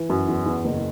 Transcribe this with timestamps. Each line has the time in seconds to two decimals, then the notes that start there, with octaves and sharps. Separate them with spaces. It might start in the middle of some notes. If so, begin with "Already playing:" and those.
Already playing: E3
0.10 F#2
0.28 E2
0.46 E2
0.65 F#1